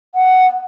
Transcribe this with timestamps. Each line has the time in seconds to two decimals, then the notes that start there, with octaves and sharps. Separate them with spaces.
0.15 F#5